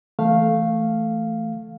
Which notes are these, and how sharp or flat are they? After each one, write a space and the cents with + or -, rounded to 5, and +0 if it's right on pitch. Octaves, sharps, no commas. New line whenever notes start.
E3 +0 A3 +0 F5 +0